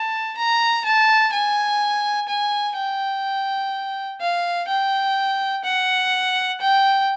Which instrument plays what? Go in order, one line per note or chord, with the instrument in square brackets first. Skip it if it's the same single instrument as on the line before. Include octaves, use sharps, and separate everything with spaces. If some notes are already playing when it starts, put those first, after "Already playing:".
Already playing: [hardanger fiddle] A5
A#5
A5
G#5
G#5
G5
F5
G5
F#5
G5